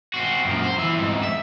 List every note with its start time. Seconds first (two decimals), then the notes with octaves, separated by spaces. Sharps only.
0.14 C4 F#4
0.45 F#2 A#2
0.63 C5
0.78 E3 E5
0.97 F2 G#2
1.23 E5